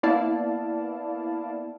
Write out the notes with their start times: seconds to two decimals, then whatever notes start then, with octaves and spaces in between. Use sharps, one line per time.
0.03 A#3 B3 E4 D5 F5 A5